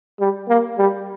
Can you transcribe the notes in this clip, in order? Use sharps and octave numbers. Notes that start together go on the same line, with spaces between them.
G3
A#3
G3